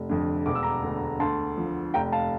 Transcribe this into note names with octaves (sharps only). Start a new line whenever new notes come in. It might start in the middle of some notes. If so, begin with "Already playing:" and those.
Already playing: F1
F2 D3
E1 D6
E6
A#5 D6
D2 D3
D2 A5 C6
D3 F3
F1 G5 A#5
F5 A5